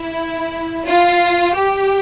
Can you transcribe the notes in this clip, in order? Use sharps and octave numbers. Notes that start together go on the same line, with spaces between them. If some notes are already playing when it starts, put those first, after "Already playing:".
Already playing: E4
F4
G4